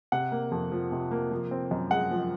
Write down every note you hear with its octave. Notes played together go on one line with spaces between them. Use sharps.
C3 F#5
A#3
F2
F3
C3
A#3
F3
C4
F#2
G#3 F#5
F3